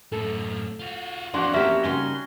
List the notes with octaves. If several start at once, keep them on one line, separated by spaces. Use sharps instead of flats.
F#2 A2 A4
F4 F#4
F2 E3 D4 F#4 F5 F#5 C6
A#3 C#4 E4 G4 E5
C#3 G3 D#4 F#4 G#5 C6